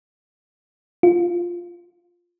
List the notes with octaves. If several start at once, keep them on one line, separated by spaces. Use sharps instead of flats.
F4